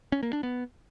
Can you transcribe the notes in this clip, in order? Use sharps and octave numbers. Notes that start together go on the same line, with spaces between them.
C#4
A#3
D4
B3